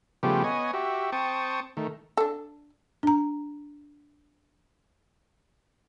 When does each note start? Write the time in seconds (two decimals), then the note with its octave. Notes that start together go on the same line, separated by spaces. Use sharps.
0.23 C#3 F3 G3 A3 B3 G4
0.44 B3 C#5 D#5 G#5
0.74 F#4 G4 E5
1.12 C4 G5 A5 C#6 D#6
1.77 D#3 A3
2.17 D4 A4
3.03 D4 A#5